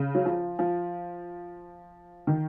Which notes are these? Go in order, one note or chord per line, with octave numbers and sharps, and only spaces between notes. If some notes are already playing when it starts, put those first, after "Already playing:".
Already playing: C#3
F#3
F3
F3
D#3